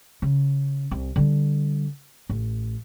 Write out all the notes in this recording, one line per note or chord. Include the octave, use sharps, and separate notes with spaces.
C#3
C2
D3 G3
A1